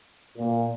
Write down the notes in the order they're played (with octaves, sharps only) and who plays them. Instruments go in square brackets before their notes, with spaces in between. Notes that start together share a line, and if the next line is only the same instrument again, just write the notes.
[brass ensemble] A#2